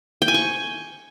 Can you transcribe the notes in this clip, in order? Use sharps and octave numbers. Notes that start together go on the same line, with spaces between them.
G5
G#5
C#6